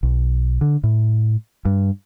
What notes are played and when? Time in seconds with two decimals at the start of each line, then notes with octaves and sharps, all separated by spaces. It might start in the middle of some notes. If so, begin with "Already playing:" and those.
0.03 B1
0.61 D3
0.84 A2
1.65 G2